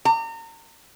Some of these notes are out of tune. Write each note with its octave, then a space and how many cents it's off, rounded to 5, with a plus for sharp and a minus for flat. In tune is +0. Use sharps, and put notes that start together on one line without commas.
A#5 -35